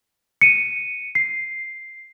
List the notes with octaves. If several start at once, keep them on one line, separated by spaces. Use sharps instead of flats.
C#7 D#7
C7